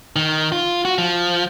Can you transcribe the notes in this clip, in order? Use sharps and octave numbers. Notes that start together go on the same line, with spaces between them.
D#3
F4
F#4
F3